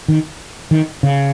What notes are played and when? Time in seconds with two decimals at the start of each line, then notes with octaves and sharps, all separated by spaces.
0.08 D#3
0.71 D#3
1.03 C#3